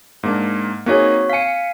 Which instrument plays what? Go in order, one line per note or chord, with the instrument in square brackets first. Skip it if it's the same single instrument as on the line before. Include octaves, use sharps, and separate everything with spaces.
[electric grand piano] G#2 A#3 D4
[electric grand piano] A#3 D#4 G#4 [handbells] C4 F#4 C#5
[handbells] F5 G#5 [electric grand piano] B6 C#7